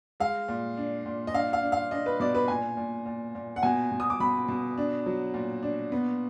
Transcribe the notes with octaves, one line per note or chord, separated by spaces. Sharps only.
G#3 F5
A#2
D4
A#2
D#5
D4 F5
F5
D4
F5
D4 D#5
B4
B2 D5
B4
A#2 G#5
A#2
A#2
A#2
F#5
B2 G#5
B2
D#6
D6
B2 B5
B2
D4
F#3
A#2
D4
B3